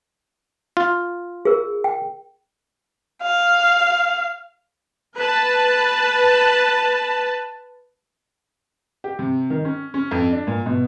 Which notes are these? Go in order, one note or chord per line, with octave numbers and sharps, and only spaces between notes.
F4
G#4 A#4
G5
F5
B4 A5
G4
C3
D#3
C#4
C#4
F2
D4
A#2
B2